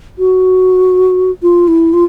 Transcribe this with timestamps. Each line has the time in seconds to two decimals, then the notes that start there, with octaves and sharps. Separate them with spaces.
0.18 F#4
1.43 F4
1.68 E4
1.93 F4